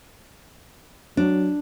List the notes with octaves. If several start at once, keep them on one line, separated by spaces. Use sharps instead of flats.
F#3 D4